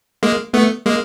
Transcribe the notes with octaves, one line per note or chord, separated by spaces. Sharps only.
G#3 A#3
A3 B3
G#3 A#3